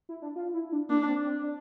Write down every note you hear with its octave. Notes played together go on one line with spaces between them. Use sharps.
E4
D4
F4
E4
D4
A#3 D4
C4
C4
D4